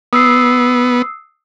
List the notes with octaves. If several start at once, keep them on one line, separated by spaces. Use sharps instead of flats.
B3 D#6 E6 C7